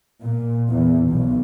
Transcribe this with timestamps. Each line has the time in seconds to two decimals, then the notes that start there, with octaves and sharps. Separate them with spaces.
0.22 A#2
0.70 E2
1.08 B1